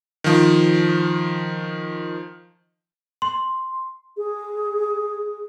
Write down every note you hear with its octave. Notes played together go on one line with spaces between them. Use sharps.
D#3 F3
C6
G#4